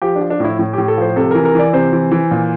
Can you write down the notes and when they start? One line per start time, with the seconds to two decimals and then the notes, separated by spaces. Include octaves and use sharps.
0.02 F3 G4
0.16 D4
0.21 F3
0.30 D4
0.40 A2 E4
0.59 A2
0.73 A2 G4
0.88 A4
0.97 F3 C5
1.16 C3 A4
1.31 E3 A#4
1.45 A#4
1.55 E3 D5
1.73 C3 C5
1.92 E3
2.11 E3
2.31 A#2